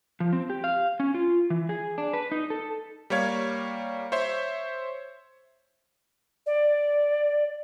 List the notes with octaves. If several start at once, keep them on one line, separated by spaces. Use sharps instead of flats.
F3
C4
G4
F5
C#4
F4
E3
G#4
D4
B4
D#4
A4
G3 A#3 C#5 F5 G#6
C5 C#5 E5 C6
D5